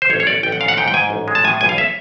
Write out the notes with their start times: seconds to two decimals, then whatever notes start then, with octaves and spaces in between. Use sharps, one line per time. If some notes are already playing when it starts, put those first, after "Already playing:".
0.02 C5
0.10 A1 C#5
0.20 C#5
0.27 A1 D5
0.43 A1 G5
0.52 F#5
0.60 G#2 F5
0.68 F#5
0.77 G#2 G5
0.88 G5
0.94 G#2 G#5
1.10 A1
1.28 G#3
1.35 A5
1.44 A2 G#5
1.61 B1 G#5
1.69 F5
1.78 E5